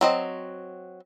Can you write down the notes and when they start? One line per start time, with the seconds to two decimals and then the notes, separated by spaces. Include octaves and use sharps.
0.01 F#3 C4 D#5